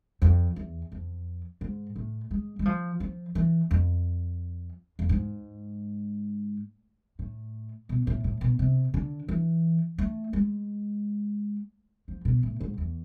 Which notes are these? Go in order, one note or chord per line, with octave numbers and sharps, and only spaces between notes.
F2
E2
F2
G#2
A2
G#3
G#3
F3
F3
E3
F2
F2
G#2
A2
B2
A2
A2
B2
C3
D3
E3
A3
G#3
F3
B2
A2
G#2
E2